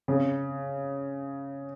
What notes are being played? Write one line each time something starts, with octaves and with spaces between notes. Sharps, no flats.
C#3